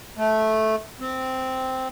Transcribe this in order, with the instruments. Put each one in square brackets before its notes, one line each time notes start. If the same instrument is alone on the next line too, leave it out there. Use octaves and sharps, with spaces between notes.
[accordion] A3
C4